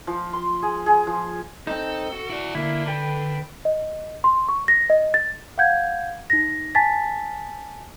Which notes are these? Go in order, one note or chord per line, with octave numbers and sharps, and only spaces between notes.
F3
C6
G#4
G#4
F3
C4 D#4 A4
F#4
E4 D5
D3 A#3 E4
A4 B4 G5
D#5
C6
C#6
A#6
D#5
A6
F5 F#5 G6 G#6
D#4 A#6
G#5 A5 A6 B6